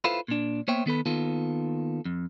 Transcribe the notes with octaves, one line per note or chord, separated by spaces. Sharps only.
E4 F4 A4 B4 C5 F5
A#2 D4
A#3 B3 C5 C#5 E5 G5
D#3 B3 A4 B4
D#2 D#3 B3 F4 A4
F2